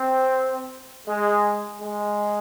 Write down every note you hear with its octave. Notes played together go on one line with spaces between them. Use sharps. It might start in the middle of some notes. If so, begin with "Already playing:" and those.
Already playing: C4
G#3
G#3